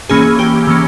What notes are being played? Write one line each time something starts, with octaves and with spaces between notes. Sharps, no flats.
E3 A#3 C#4 G#4
G4
E3 A#3 C#4